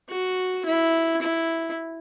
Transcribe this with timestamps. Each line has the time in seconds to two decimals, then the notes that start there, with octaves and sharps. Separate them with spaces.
0.09 F#4
0.65 E4
1.22 E4